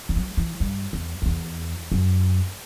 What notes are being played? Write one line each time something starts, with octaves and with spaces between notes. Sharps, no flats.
E3
F#3
E3
G2
E2
F#2
E2
F#2